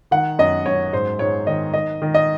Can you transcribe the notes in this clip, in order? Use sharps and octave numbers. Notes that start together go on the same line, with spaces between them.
D#3 F#5
F#2 D#5
F#2 C#5
G#2 C5
G#2 C#5
D#3 D#5
D#3 D#5
D#3
D#5